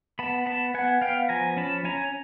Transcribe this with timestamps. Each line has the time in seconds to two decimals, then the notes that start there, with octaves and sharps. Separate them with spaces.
0.19 B3 A5 B5
0.46 B3 A5 B5
0.74 B3 F#5 G#5
1.02 B3 F5 G5
1.29 F3 G#5 A#5
1.57 C#4 A5 B5
1.84 C#4 G#5 A#5